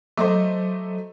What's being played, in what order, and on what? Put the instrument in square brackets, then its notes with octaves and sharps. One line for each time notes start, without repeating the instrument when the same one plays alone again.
[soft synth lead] F#3 [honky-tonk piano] A3 C5 [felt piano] D#5 A#5 D6